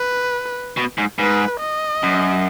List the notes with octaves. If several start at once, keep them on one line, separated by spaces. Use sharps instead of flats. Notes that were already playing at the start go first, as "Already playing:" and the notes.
Already playing: B4
B2
G#2
G#2 B4
D#5
F#2